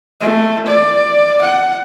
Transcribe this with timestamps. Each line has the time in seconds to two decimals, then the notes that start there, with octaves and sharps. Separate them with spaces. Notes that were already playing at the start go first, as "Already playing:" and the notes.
0.20 A3
0.66 D5
1.42 F#5